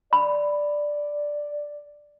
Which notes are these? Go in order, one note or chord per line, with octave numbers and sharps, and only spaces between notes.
D5 B5